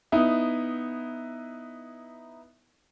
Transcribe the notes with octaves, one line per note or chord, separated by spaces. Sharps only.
B3 D#4 E4